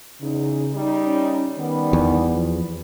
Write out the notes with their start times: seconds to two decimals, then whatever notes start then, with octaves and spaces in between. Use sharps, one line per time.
0.21 E2 C#3 D#4
0.73 G3 D#4
1.04 C#4
1.58 D#3 G3 B3
1.93 E2
2.33 F3